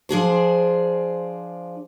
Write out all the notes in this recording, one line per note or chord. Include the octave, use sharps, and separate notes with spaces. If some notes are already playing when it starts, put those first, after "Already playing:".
F3 D4 G#4 C5